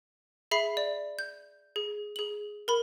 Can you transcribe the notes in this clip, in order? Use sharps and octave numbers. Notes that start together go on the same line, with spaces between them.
G#4 E5 B5 C7
D5
G6
G#4
G#4 F#7
A#4 B5